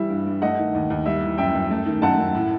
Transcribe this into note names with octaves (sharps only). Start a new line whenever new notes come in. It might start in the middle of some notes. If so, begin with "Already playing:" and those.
Already playing: E3 G3 E5
G2
G2
A3 D#5 F#5
D#3
D#2
D#2
G3 E5
E3
F#2 E5 G5
F#2
A3
D#3
F#2 F#5 A5
F#2
A2